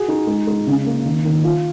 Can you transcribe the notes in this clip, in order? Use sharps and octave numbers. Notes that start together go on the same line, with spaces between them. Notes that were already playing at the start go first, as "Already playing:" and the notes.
Already playing: F#4 G#4
D#4
G#3
G#3
C#3
A#3
D#3
D#3
F4